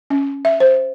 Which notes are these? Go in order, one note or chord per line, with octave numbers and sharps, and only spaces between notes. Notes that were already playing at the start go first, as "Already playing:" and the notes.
C#4
E5
C5